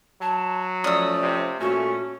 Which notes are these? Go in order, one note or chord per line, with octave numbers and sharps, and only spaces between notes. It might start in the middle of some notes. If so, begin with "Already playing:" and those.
F#3 A5
F3 A3 C#4 D5 D#6 E6
C3
A#2 A3 C#4 F#4